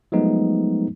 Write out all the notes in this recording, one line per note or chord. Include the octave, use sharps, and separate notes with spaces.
F3 F#3 G#3 A3 B3 D#4